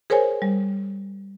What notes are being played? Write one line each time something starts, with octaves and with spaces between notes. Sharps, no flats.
G#4 A#4 C5 C#5 G#5
G3